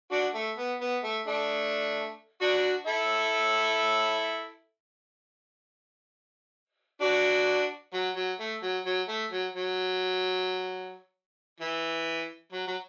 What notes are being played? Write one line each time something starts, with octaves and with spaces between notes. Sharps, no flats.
D4 F#4
A3
B3
B3
A3
A3 D4
D4 F#4
E4 A4
D4 F#4
F#3
F#3
A3
F#3
F#3
A3
F#3
F#3
E3
F#3
F#3